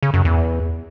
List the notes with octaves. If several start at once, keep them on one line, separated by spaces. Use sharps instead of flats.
C#3
F#2
E2